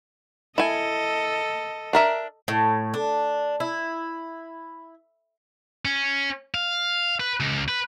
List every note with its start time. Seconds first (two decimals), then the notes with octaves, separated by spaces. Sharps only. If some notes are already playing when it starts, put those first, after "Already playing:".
0.58 E4 A4 D#5 G#5
1.93 D4 A#4 E5
2.48 A2
2.94 D4
3.60 E4
5.85 C#4
6.54 F5
7.20 B4
7.40 C#2
7.68 B4